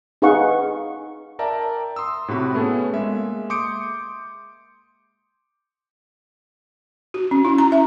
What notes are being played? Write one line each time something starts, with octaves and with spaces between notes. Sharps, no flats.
D#4 G#4 B4 F5 F#5 C#6
A#4 D5 E5 G5 A5 A#5
C6 D#6 E6
A2 C3 F#4 B5
A3 B3 C#4 G#4 A4
G#3 A#3 E5
C6 D6 D#6 G6 C#7 D7
F#4
C#4
E4
A#5
E5